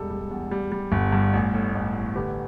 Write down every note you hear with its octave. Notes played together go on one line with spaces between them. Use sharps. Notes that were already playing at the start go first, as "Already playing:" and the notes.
Already playing: E1 G3 A4
G3
E2
G3
G3
G1
G2
A1
A2
A1
A1
D3 G4 B4